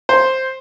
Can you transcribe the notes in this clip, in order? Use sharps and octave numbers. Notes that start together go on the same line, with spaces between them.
C5